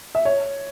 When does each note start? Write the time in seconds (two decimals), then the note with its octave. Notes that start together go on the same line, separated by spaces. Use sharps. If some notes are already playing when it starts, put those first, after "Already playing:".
0.15 E5
0.25 C#5